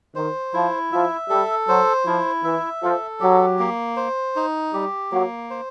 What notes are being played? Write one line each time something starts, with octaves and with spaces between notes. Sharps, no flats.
D#3 C5
F3 E4
F3 E5
G3 A4
F#3 C5
F3 E4
E3 E5
F3 A4
F#3 G4
A#3
C5
D#4
G3 G4
F#3 A#3
C5